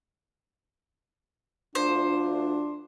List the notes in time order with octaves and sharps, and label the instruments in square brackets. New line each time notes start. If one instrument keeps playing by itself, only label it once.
[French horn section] D2 F4 [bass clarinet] D4 [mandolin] C5